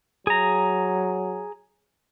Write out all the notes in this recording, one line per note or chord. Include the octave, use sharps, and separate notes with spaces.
F#3 G#4 A#5